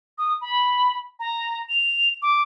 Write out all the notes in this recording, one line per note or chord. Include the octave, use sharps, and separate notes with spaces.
D#6
B5
A#5
F7
D6